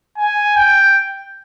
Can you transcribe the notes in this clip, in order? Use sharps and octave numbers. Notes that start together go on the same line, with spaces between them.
G#5
G5